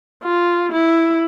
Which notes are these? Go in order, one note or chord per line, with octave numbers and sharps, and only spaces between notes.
F4
E4